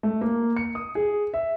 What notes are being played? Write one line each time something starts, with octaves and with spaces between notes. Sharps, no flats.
A3
A#3
C#7
D#6
G#4
E5